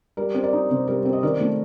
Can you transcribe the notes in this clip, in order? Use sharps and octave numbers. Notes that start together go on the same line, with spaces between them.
G3 A#4 D5
C4
A#4 D5
D#4
C3 C5
G3 A#4
C4
D#5
D#3 A#4 D5
A3